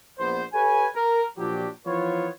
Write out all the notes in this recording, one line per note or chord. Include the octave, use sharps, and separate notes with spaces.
A#1 B3 C5
G4 A4 B4 C#5 G#5
A#4
A#2 F3 F#3 D4 G4
E3 F3 B3 F4 B4 C#5